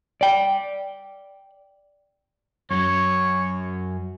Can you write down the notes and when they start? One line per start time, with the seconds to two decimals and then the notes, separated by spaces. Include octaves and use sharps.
0.21 D5 G5
2.71 F#2 F#3 C#5